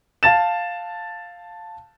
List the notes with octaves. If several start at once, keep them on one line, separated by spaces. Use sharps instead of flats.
F5 A5 A6 E7